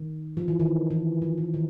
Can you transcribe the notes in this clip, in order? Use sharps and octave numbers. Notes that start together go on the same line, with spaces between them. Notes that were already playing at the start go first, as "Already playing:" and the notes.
Already playing: D#3
F3
E3
D#3
E3
F3
E3
D#3